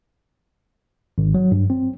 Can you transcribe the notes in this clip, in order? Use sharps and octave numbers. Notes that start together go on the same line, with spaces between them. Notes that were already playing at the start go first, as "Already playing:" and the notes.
G#1
F#3
G2
C4